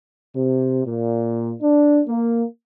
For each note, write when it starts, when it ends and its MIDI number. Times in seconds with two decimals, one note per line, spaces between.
0.35 0.85 48
0.86 1.53 46
1.62 2.00 62
2.07 2.44 58